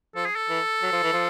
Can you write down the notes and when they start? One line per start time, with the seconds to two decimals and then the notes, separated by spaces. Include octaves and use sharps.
0.15 F3 A4
0.26 G#4
0.36 A4
0.49 E3
0.82 F#3
0.93 F3
1.03 E3
1.12 F3